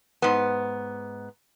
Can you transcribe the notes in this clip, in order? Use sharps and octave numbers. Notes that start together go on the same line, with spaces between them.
G#2 B3